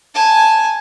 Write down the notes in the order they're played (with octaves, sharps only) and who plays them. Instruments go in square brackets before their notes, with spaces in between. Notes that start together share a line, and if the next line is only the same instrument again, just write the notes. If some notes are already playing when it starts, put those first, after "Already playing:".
[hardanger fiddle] G#5 A5